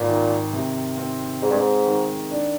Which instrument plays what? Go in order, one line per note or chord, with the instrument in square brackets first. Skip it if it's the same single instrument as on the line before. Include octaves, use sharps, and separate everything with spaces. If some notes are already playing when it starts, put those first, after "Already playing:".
Already playing: [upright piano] G#1 [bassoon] A#2
[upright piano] D#3
C3
C4
[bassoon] G#2 [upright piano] G#3
[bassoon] G2
G#2
[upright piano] D#3
D4